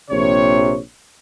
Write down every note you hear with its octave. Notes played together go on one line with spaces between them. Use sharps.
A#1 C3 C#5